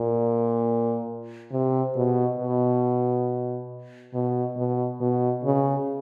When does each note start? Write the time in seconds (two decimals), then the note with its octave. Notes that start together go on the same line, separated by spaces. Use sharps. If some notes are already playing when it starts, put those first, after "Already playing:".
Already playing: A#2
1.52 C3
1.96 B2
2.39 B2
4.14 B2
4.57 B2
5.01 B2
5.44 C#3